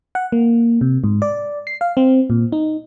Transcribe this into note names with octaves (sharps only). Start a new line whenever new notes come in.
F#5
A#3
C3
G#2
D5
C7
F5
C4
A#2
D#4